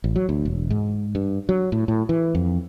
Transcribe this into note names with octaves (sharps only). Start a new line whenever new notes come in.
A1
F#3
D2
E1
G#2
G2
F#3
A2
A2
E3
F2